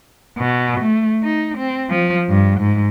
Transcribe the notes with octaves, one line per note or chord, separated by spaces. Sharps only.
B2
A3
D#4
C4
F3
G2
G#2